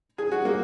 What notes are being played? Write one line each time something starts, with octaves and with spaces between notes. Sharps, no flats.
G#4
F#4
A#3